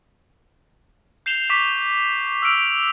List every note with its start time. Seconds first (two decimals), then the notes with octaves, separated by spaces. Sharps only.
1.26 G6 C7 E7 F7 G7
1.50 C#6 D6 B6
2.42 E6 F6 D7 F7